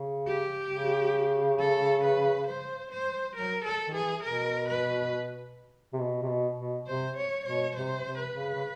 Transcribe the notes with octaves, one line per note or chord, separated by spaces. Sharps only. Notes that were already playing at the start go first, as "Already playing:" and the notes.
Already playing: C#3
G4
C#3
A4
B4
C5
C5
F#3 A#4
A4
D#3
E3 G#4
B2 A#4
B4
C3
B2
C3
B2
B2
C3 C5
C#5
B2 C#5
C3 C5
C3
B4
C#3
C#3